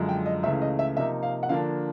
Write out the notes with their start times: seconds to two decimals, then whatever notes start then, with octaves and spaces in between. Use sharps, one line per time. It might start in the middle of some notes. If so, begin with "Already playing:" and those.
Already playing: F#2 D3 F3 G#3
0.09 G5
0.26 D#5
0.43 C#2 C#3 E3 A3 C#4 E5
0.62 D#5
0.79 E5
0.97 C3 F3 A#3 D#4 E5
1.23 F5
1.43 F#5
1.49 D3 F3 A#3 D4 F5